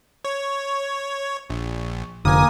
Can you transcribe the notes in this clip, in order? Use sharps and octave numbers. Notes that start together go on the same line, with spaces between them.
C#5 C#6
A#1
F1 D3 A#3 G#5 D#6